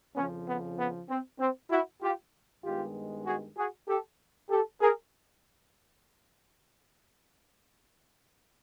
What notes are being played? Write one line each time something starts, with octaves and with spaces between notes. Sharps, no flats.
F2 C#3 F3 B3 C#4
B3
B3
C4
C4
E4 F#4
F4 G4
G2 D#3 G#3 B3 F4 G4
F#4 G#4
F#4 G#4
G4 A4
G4 A4
G#4 A#4